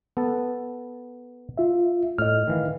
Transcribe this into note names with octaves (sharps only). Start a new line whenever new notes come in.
B3 A4 A5
F4 E5
A2 D#5 F6
D#3 E3 F5